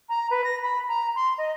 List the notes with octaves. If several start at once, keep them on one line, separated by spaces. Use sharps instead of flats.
A#5
B4
A#6
B5
A#5
C6
D#5